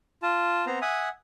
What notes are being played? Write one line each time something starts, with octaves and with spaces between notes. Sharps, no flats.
F4 A5
B3 C4 C5 A#5
E5 F#5 G#5 D#6